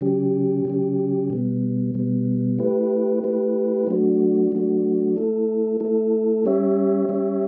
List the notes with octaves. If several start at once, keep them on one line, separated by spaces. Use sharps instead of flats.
C#3 F#3 C#4 G4
C#3 F#3 C#4 G4
B2 G3 B3
B2 G3 B3
A3 E4 G4 B4
A3 E4 G4 B4
F#3 A3 D4 F#4
F#3 A3 D4 F#4
A3 E4 A4
A3 E4 A4
G3 C#4 G4 C#5 E5
G3 C#4 G4 C#5 E5